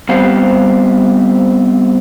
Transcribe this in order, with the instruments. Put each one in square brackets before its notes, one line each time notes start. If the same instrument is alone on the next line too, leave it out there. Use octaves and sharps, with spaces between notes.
[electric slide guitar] G3 B3 C4 G4 C5 F5